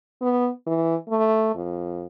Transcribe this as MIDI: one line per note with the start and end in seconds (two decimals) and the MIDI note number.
0.22 0.49 59
0.66 0.95 52
1.09 1.53 57
1.55 2.06 41